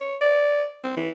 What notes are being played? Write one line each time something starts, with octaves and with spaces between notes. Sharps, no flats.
C#5
D5
C4
E3